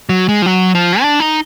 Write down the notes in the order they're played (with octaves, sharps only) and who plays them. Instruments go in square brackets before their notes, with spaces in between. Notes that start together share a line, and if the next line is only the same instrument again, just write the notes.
[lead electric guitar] F#3
G#3
F3
F#3
F3
D4
D#4